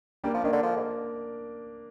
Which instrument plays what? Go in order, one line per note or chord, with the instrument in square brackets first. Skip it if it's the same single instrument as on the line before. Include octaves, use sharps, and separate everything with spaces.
[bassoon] G3 [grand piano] A#3 D4
[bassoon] F3
[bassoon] D#3 [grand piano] A#3 D4
[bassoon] D3
F3
G#2